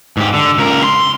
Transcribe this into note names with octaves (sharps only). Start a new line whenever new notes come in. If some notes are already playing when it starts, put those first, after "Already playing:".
G#2 G4
D3
C#2 A#4
C6